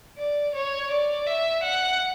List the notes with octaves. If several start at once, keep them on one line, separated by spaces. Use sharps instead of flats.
D5
C#5
D5
E5
F#5